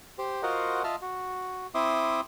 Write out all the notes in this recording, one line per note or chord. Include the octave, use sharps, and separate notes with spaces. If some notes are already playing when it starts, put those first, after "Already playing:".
G4 C5
F4 F#4 A#4 C5 D#5 F#5
F4 D#5 E5 A5 F6
F#4
C4 E4 E5 C6 D6 D#6